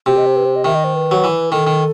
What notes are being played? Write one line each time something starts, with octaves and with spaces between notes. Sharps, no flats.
C3 F#4
D#5
C5
B4
C5
D#5
D#3 E5
D#5
C5
B4
F#3
E3
D#3 A4
D#3